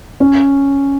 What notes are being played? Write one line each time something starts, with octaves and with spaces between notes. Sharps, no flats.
C#4